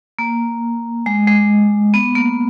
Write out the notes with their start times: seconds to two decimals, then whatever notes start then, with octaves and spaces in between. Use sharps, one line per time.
0.19 A#3
1.06 G#3
1.28 G#3
1.94 B3
2.15 A#3